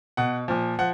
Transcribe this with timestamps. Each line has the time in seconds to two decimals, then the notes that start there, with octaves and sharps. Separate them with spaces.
0.17 B2 F#5
0.48 A#2 F3
0.79 F3 F#5